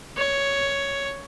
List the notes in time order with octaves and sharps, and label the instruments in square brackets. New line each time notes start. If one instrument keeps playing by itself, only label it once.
[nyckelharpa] C#5